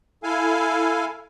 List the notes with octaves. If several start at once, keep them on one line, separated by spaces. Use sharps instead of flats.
E4 A4 F5 G#5